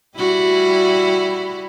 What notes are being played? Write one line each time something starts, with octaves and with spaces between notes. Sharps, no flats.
G3 E4 F#4